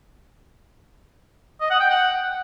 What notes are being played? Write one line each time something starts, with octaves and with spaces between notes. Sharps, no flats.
D#5
F#5
G5
F#5